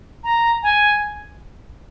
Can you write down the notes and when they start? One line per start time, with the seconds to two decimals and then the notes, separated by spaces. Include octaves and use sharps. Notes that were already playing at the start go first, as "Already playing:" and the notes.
0.24 A#5
0.63 G#5